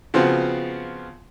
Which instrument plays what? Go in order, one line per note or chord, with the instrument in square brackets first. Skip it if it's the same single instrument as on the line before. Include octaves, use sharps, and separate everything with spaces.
[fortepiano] C#3 F3 B3 C4 F4 F#4